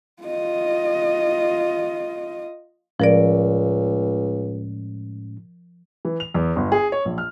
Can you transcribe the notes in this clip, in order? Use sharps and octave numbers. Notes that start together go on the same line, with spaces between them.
F4 D#5
C#2 A2 F3 G#3 C#4 A#4 D5
E3
F7
E2
G1
G#4
C#5
A#1
F6